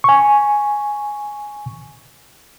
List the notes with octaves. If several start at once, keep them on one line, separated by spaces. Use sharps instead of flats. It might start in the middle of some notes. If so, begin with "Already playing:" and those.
G#5 C#6